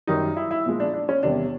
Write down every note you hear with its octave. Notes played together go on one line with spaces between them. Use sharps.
F#2 D#3 G3 D#4
E4
E4
A#2 F3 G#3
D4
D4
C#4
E2 C3 D#3 G3 D4